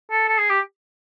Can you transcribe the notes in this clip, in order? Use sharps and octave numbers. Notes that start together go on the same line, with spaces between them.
A4
A4
G#4
G4